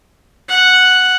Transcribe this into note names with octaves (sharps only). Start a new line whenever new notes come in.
F#5